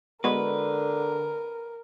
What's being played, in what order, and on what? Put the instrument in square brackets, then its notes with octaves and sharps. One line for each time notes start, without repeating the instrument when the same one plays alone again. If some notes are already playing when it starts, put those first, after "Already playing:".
[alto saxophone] D3 [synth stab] G#3 B3 F#4 [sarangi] A#4 [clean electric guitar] B4